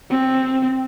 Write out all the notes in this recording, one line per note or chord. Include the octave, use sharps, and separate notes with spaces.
C4